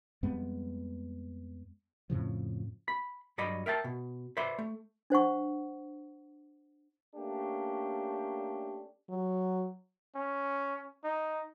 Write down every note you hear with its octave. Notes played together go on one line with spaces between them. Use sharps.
F2 G3 G#3 B3
F2 A2 C#3 F3
B5
G2 F#3 D5 D#5 B5
A#4 E5 G5 A5
B2
B4 C5 D5 E5 B5 C6
A3
D4 C5 F#5 C#6
A3 A#3 C#4 D4 G4
F#3
C#4
D#4